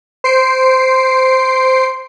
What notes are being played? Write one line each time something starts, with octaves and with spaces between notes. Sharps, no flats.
C5 C7 D7